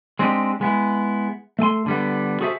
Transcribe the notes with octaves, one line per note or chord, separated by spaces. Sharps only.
G#3 C4 D4 D#4 F#4 G4
G#3 B3 E4
A3 A4 G#5 C6
D3 G3 B3
F#4 G#4 A4 C5 E5